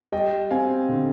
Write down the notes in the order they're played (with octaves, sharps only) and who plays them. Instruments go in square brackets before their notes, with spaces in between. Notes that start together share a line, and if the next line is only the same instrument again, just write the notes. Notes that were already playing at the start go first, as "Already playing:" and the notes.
[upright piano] G3 D#5 G5
C4 F5 G#5
D3